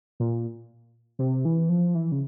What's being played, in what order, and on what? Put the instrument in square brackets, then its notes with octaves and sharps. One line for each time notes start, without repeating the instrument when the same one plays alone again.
[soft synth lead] A#2
C3
E3
F3
E3
C#3